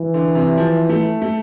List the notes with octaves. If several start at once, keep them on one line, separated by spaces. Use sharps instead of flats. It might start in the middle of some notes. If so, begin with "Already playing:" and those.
Already playing: E3
D3
C3
F3
A3
A3